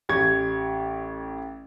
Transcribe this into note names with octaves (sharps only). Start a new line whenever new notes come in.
A1 G4 C#6 G#6